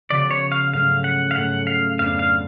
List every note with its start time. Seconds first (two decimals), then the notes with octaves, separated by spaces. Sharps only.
0.10 C#3 F3 B3 F#4 D5
0.31 C#5
0.52 F5
0.72 G#2 F#3 A3 C#4 F5
1.04 F#5
1.31 F5
1.36 G#2 F#3 A3 C#4 F#5
1.67 F5
1.99 F2 F3 B3 D4 F5
2.19 F5